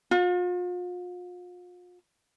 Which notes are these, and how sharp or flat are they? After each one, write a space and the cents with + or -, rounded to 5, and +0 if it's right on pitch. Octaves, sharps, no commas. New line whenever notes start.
F4 +40